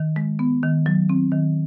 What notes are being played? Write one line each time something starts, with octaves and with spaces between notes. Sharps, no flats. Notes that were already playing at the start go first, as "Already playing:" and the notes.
Already playing: D#3
G#3
B3
D#3
F#3
C4
D#3